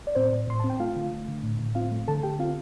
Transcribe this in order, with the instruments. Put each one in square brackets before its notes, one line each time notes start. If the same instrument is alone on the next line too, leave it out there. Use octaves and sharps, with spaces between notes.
[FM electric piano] D5
A2 C4 C5
A2
A2 C6
C4 A5
G5
A3 F4 F5
D3
A3
D3
A2
A2
C4 F4 F5
A3
D3 A4 A5
D3 G4 G5
C4 F4 F5